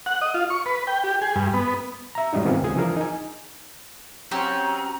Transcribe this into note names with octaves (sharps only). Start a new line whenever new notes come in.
F#5
D#5
F4
C#6
B4
G5
G4
G#4
G2
B3
E5 A#5
G#2 G3 C#4 D#4 E4
D#3 B3 C4 F4 G#4
C#2 G#4
E3 F3 D4 G#4 A#4
D#4 G#5
F#3 C4 C#4 G4 A#5